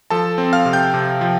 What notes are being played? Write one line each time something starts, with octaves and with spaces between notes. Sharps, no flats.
F3 A4 A5
C4
F5 F6
C3
G5 G6
C3
F3